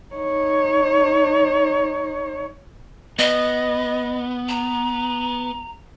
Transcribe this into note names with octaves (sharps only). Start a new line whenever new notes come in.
D#4 C#5
B3 D#5
A#5